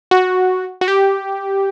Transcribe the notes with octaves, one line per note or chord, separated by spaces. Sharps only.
F#4
F#4
G4